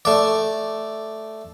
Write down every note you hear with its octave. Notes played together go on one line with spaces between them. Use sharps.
A3 D5